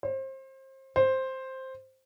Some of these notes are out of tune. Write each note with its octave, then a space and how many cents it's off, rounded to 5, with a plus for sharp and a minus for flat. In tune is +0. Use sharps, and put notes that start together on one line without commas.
C5 +30
C5 +5